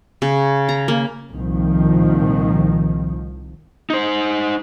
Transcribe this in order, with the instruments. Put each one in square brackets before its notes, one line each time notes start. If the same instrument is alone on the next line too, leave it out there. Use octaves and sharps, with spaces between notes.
[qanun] C#3
A#5
A#3
[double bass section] C2 A#2 D#3 F3
[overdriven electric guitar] D#4 C5